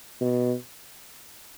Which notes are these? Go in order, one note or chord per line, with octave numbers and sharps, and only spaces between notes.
B2